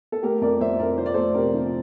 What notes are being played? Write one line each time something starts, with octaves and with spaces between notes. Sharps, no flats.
A4
A3 G4 A#4
F2 A#4 D5
F2 C5 E5
F2 A#4 D5
F3 C5
D5
A3 A4 C5
C3 G4 A#4
F3